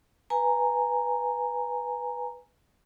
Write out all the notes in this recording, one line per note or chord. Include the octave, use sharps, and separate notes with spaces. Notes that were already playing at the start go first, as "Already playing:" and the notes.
B4 G#5 A#5